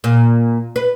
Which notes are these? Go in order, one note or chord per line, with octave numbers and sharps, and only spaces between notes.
A#2
B4